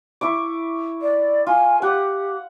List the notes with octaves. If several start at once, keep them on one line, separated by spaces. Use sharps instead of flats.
E4 C#6 D6
D5
F4 G#5
G4 F#5